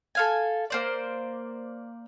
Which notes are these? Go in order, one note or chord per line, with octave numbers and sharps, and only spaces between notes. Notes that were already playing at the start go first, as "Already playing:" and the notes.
A4 F5 G#5
A#3 C5 D5